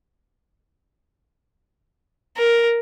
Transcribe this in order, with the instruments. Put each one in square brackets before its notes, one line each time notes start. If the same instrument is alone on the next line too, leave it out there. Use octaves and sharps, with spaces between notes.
[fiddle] A#4